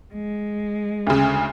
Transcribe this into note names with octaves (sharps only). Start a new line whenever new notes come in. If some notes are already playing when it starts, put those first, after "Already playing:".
G#3
D2 C#3